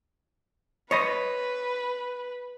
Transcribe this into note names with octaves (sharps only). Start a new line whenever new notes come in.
B4 C#5 D#5 B5